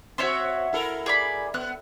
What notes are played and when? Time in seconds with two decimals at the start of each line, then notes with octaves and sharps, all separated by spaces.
0.18 C4 F#4 C#5 E5 C6
0.73 E4 A4 A#4
1.06 G#4 D5 B5
1.54 B3 F#6